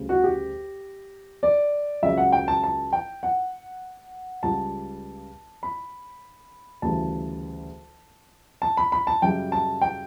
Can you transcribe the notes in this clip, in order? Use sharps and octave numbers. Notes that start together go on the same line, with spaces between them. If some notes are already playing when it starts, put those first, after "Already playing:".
Already playing: D2 C#3 G3
F#4
G4
D5
C#2 C#3 F#3 E5
F#5
G5
A5
A5
G5
F#5
C#2 C#3 G3 A5
B5
D2 C#3 E3 G3 A5
A5
B5
B5
A5
F#2 C#3 G3 G5
A5
G5